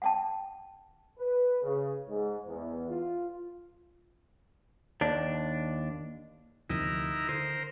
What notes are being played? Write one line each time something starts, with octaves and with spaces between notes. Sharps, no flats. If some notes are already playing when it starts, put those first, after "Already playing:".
F#5 G5 A5
B4
C#3
G#2
E2
F4
D#2 D4
D2 C3 F3 D#4 E4 A#4
D3 A#4 C5